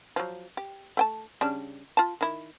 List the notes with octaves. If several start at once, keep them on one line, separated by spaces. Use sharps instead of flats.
F3 F#3
G4
A3 G5 A5
C#3 G3 D4
F4 A5
D#3 E4